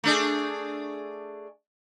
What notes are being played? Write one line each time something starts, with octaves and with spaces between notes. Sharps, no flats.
A3 D4 G#4